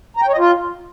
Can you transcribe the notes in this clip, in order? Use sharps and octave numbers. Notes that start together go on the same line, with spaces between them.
A#5
G5
C#5
D#5
F4